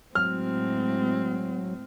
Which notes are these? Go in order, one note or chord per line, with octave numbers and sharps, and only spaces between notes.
A2 F#3 G#3 C4 F6